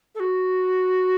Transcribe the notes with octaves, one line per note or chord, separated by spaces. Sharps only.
A4
F#4